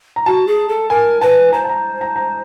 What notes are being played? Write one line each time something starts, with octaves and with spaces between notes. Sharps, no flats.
A#5
F#4 A5
G#4
A4
A#4 G#5
B4 A5
C5 A#5
A5
A#5
A#5
A#5